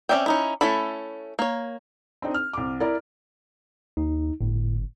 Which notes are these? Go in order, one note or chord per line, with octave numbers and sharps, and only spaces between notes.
C4 C#4 D5 E5 G5
C#4 D#4 E4
A3 C#4 E4 A4 B5
A#3 C#5
C4 D4 D#4
F6
C2 D6
E4 A#4 D5
D#2 D#4
G1 A2